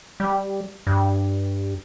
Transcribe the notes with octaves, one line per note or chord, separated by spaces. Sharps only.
G3
G2